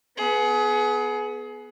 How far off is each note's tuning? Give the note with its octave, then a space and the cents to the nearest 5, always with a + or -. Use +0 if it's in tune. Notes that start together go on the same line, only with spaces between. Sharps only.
B3 +0 G#4 +30